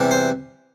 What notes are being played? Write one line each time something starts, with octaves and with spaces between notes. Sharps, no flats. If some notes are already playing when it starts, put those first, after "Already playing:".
Already playing: E2 C3 E3 G3
C5